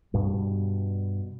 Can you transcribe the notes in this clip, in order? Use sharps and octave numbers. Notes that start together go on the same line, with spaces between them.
G2 B2 G3